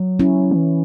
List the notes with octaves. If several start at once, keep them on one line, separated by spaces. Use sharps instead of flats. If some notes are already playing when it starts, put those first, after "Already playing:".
Already playing: F#3
C#4 E4
E3